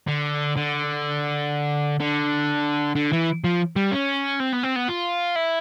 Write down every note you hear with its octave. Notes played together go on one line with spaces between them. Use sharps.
D3
D3
D3
D3
E3
F3
G3
C#4
C4
B3
C4
B3
F4
E4